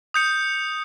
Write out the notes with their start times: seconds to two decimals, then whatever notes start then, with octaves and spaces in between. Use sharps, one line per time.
0.14 D#6 G6 C#7